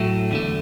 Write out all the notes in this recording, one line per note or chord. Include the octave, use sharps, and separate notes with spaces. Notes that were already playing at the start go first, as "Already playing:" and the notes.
Already playing: A2 F#3 A3
E2 D3 A3